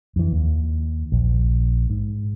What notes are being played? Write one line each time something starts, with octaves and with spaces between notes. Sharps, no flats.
F2 E3
D#2
A#1
G#2